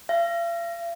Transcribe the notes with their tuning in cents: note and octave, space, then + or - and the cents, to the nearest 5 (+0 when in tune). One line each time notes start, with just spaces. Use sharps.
F5 -45